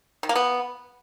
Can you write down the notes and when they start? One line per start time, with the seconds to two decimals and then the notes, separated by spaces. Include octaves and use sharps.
0.23 D#3
0.29 A#3
0.36 B3